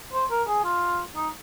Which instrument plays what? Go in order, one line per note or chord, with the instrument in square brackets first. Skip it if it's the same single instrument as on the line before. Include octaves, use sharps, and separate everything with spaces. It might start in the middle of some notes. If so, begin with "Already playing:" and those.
[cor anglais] C5
A#4
G#4
F4
D#4